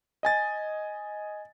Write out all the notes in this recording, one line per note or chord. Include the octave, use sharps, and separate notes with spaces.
D#5 G#5 A6